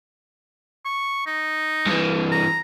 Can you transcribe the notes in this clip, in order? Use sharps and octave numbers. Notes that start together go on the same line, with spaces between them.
C#6
D#4
G2 E3
A#5